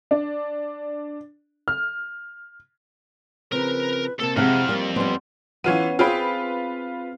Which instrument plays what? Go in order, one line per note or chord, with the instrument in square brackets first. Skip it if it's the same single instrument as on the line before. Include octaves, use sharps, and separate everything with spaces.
[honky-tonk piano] D4
F6
[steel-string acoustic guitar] C#3 F3 C4 [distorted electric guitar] A#4 [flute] B4
[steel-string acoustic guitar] C3 A#3 C4 [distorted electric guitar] A4 A5
[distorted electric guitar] F2 [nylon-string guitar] C3 E5 F#5 [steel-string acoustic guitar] E3 G#3 [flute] F6
[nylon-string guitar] G3 [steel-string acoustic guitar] A#3
[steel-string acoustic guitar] F3 C#4 [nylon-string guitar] G3 B3 [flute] C6
[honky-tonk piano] E3 F4 D#7 [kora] B3 C#4
[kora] C4 G#4 G5 [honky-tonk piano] F4 B4